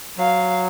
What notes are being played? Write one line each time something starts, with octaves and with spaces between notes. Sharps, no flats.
F#3 F5